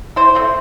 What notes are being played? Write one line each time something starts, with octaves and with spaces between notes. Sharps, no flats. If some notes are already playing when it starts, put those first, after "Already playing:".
E3 C5
A3 C4